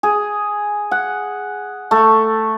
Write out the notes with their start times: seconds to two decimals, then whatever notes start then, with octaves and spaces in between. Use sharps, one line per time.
0.03 G#4
0.91 F#5
1.91 A3